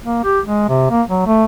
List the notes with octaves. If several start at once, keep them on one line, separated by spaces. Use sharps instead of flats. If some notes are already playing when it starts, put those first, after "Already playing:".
A#3
G4
G#3
C3
A#3
F#3
A3